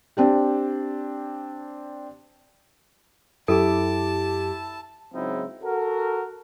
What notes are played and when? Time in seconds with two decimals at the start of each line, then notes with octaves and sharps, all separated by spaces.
0.17 C4 D4 G4
3.48 F#2 E4 G4 A4 A5 D6
5.14 G#2 C#3 F#3 C4 D#4 E4
5.64 F#4 A4 A#4